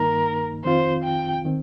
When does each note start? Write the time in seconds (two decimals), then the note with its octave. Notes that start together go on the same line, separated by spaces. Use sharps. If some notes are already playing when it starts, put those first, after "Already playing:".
Already playing: G2 D#3 A#3 D#4 A#4
0.64 F2 D#3 C4 F4 C5
1.04 G5
1.45 D#3 C4